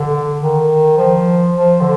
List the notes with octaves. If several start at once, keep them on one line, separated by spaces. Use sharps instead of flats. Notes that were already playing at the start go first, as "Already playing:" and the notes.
Already playing: D3
D#3
F3
F3
D3